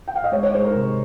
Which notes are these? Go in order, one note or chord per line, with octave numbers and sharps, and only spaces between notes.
G5
F5
D#5
G#3 C#5
C#5
G#3 C5
A#4
C3